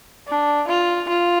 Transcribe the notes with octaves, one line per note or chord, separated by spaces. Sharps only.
D4
F4
F4